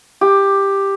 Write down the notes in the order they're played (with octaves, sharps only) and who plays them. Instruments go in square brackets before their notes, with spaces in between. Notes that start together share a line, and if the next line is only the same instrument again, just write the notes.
[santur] G4